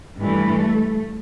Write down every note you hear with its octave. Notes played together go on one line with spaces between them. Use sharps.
G2 E3 A3